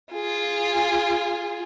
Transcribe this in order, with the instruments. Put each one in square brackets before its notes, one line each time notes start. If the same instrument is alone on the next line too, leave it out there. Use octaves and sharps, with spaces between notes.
[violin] F4 G#4